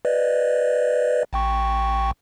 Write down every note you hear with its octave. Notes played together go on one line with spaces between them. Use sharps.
B4 D5 D#5
A1 G5 C#6